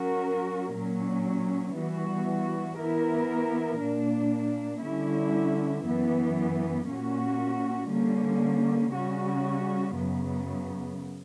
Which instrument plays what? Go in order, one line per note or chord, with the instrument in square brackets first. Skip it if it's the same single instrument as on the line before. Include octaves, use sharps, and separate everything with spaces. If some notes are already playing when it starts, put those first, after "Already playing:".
Already playing: [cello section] F#3 C#4 F#4 A#4
A#2 F#3 C#4
E3 G3 B3 F#4
E3 B3 E4 A#4
A#2 A#3 D4
D3 G3 C#4 E4
F#2 E3 B3
A#2 A#3 C#4 F#4
D3 G3 A#3 C#4
C#3 G3 C#4 F#4
F#2 C#3 F#3 B3